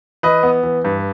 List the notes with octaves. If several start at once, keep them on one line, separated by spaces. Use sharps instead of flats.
E3 B4 D#5
B3
E3
G2